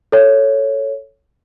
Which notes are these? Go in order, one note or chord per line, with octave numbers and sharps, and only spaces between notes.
A4 C#5